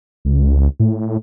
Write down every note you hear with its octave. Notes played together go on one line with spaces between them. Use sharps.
C#2
A2